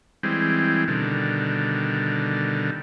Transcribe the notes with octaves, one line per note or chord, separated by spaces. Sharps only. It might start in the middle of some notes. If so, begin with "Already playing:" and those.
E3 G3 G#3 C4
B2 D3 D#3 G3